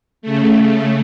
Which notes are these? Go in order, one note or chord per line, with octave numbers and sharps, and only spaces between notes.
C#3 A3